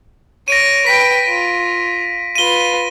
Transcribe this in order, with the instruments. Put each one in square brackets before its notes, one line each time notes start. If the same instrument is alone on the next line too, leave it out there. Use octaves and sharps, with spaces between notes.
[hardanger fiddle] C#5 [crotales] A#6 D7 D#7
[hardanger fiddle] B4 G5 [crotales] B6
[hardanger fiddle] F4
[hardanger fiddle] F4 B4 [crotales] D#7 G7